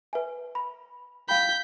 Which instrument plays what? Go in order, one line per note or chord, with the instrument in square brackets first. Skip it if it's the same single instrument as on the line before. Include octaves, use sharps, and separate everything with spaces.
[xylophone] B4 E5 G#5
B5
[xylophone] F5 G5 B5 [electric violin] G6 B6